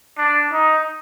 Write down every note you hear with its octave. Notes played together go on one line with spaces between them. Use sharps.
D4
D#4